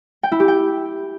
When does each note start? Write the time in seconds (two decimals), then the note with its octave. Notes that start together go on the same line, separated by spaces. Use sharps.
0.23 G5
0.32 E4
0.40 G4
0.48 G5